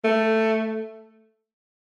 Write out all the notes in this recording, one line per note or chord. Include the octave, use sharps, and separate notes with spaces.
A3